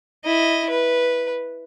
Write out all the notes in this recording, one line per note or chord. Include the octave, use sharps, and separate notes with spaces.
E4 D#5
B4